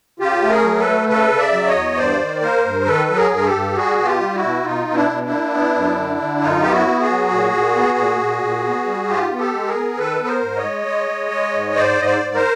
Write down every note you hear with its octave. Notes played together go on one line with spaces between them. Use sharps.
C#3 F4 G4
A3
G#4 A#4
F#3
A4 B4
A3
C#3 A4 B4
C#3
D5 E5
F#3
C#5 D#5
E2
G2 C5 D5
D#3
A#3 A#4 C5
G2
D#3 A4 B4
F#3
G#4 A#4
G2 A#4
G4 A4
G2
G3 F#4 G#4
B2
F4 G4
G3
E4 F#4
B2
B2 D#4 F4
B2
D4 E4
B2
D4 E4
A#3
B3
F#2
D3
D3
F#2 D#4 F4
B3 G4
E4 F#4
B3
F#4 G#4
F#3
A#2
A#2
B3
A#2
A#2
A#2
B3
G3
G#2 F4 G4
B3
G4 A4
G#3
G#4 A#4
B3
D#3 A4 B4
B3
A#4 C5
G#2
C#5 D#5
G#3
G#3
G#3
G#3
G#2
G#2 C5 D5
G#2 D#5
C5 D5
G#2
A#4 C5